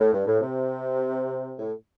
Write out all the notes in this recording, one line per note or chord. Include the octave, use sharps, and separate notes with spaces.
A2
G2
A2
C3
A2